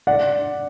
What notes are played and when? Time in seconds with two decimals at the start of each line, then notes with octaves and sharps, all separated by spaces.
0.07 D5 F#5